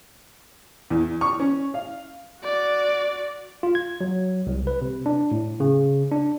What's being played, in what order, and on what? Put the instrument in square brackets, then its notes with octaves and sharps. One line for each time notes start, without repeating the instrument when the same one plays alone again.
[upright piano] E2
C#6
C#4
F5
[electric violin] F#4 D5
[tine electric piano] F4
G#6
F#3
C2
B4
C3
D4
A2
C#3
D4